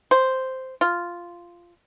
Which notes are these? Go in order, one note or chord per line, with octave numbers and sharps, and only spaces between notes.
C5
F4